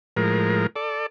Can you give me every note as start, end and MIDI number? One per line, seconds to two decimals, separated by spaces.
0.17 0.67 45
0.17 0.67 53
0.17 0.67 56
0.17 0.67 70
0.76 1.06 69
0.76 1.06 74